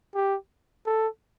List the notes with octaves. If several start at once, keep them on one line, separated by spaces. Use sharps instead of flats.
G4
A4